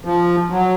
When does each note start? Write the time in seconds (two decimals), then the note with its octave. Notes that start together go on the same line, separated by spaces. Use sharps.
0.05 F3
0.50 F#3